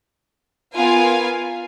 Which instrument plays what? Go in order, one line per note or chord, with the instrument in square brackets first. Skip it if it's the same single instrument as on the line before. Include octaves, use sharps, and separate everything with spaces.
[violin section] B3 F4 A#4 F5 G#5